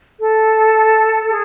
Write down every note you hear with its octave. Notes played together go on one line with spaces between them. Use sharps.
A4
G#4